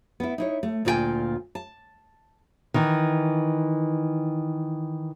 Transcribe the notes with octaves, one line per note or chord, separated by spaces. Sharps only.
B3 E4
D#4 E4 C#5
A3
D2 A#2 F4 F#4 G5 G#5
A5
D#3 E3